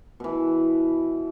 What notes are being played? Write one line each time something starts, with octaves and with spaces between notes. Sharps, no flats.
B2 E3